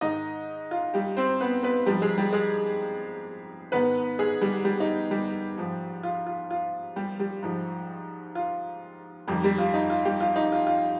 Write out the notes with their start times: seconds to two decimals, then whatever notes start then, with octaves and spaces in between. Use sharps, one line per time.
0.01 G#2 D#3 D#4 D#5
0.71 F4
0.94 G3 G4
1.17 C4 C5
1.41 B3 B4
1.63 B3 B4
1.86 G#2 F3 G3 G4
2.02 G#3 G#4
2.18 G3 G4
2.33 G#3 G#4
3.72 G#2 D#3 B3 B4
4.19 G#3 G#4
4.41 G3 G4
4.65 G3 G4
4.80 D#4
5.11 G3 G4
5.58 G#2 F3
6.03 F4
6.26 F4
6.51 F4
6.96 G3 G4
7.19 G3 G4
7.43 G#2 F3
8.35 F4
9.28 F2 D#3 G3 G4
9.43 G3 G4
9.58 F4
9.74 D#4
9.90 F4
10.05 G3 G4
10.21 F4
10.36 D#4
10.52 F4
10.67 F4